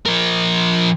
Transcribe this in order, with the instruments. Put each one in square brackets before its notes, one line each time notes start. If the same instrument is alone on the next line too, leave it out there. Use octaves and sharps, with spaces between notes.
[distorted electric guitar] F3 A#4